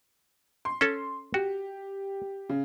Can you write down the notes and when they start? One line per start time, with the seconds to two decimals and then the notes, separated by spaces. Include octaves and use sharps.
0.65 C6
0.81 C#4 A4
1.34 F#4 G4
2.49 C#3